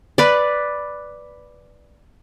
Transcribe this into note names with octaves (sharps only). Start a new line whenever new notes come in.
B4 D5